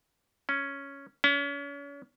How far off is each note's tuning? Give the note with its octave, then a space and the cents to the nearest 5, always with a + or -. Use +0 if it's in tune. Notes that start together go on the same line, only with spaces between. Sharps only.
C#4 +0
C#4 +35